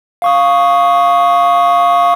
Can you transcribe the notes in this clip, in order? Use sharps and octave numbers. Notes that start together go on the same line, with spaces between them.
F5 C#6 D#6